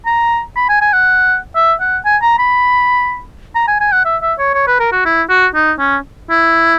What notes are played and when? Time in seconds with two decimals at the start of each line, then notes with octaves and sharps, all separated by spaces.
0.06 A#5
0.56 B5
0.69 G#5
0.81 G#5
0.93 F#5
1.56 E5
1.80 F#5
2.05 G#5
2.22 A#5
2.39 B5
3.55 A#5
3.67 G#5
3.80 G#5
3.92 F#5
4.05 E5
4.22 E5
4.39 C#5
4.54 C#5
4.67 B4
4.80 A#4
4.92 F#4
5.05 E4
5.29 F#4
5.55 D#4
5.79 C#4
6.30 E4